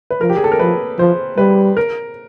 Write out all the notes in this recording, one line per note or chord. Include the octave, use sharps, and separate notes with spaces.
B4
F3 A#4
G4
G#4
A4
A#4
F3 B4
F3 C5
G3 B4
A#4